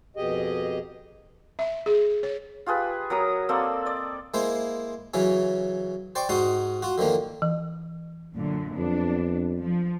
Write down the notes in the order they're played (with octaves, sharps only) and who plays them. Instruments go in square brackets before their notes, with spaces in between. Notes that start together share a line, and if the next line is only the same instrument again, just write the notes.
[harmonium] F2 B2 G4 G#4 D#5
[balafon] E5
G#4
C#5
[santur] F4 G4 G#4 B4
F#3 A#4 A#5 D#6
A#3 C4 A4 D5
D5 D#5
[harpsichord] G#3 A#3 E4 C5
C#3 E3 F#3 C#4
C5 D5 G5 C#6
G#2 D#4 F#4 C6 D#6
F4 F#4
D3 D#3 F3 A#3
[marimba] E3
[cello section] F#2 A#2 D3
[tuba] F2 [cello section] B3 D4
[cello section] F3